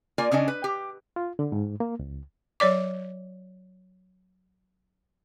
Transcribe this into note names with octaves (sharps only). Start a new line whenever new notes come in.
A#3 F4 A#4 D5 G#5
C#3 C#4 D4 D#5 G#5
B4
G4
F4
D3
G#2
A#3
C#2
F#3 C#5 D5 D6